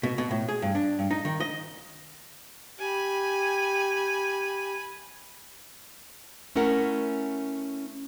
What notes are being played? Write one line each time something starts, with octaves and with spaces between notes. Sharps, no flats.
B2
B2
A2
G#4
G2
D4
G2
D#4
D#3
D#5
G4 G#5 B5
A3 C#4 E4 A#4 F#5